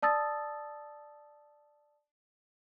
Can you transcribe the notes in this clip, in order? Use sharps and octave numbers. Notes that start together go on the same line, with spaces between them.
D5 A5 D#6 E6 A6